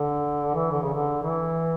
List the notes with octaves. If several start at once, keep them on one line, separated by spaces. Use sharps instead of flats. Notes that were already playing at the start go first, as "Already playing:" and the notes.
Already playing: D3
E3
D3
C#3
D3
E3